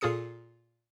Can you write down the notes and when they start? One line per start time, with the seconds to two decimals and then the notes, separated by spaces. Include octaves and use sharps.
0.01 A#2 F4 G#4 A4 D#6 C#7